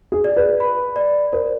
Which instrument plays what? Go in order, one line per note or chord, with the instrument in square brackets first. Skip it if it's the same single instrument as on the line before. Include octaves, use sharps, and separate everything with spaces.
[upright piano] G#4
[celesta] D5
[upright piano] B4
[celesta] B5
D5
[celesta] A#4 [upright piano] C5